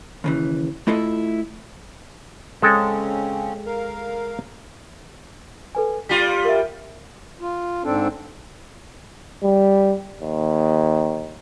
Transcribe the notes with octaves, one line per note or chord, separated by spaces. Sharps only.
D#2 C#3 E3
A3 E4 F4 A4 D#5 E5
C#3 G#3 C4 C#4 A4 G5
A#4 F5
A4 B4 G#5
G3 F4 B6
A#4 E5
F4
G#2 C4 D4 A4
G3
D#2